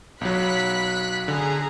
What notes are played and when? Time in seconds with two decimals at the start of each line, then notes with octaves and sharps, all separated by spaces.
0.21 B1 F#3 B5 F#6 B6
1.28 D3 G#4 A#5